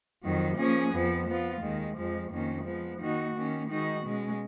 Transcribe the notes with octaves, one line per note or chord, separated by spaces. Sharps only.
F2 D#3 F#3
F3 A#3 C#4 G#4
F2 F3 B3
F3 B3 F4
D#2 D#3 G#3
F2 F3 G#3
F2 D#3 A#3 C#4
F3 G#3 B3
D#3 A#3 D#4 F#4
D#3 A#3 C#4
D#3 G#3 D#4 F#4
B2 G#3 C#4